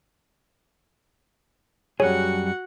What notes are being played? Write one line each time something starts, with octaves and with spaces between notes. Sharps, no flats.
F#2 G3 F#4 G#4 C#5 F#5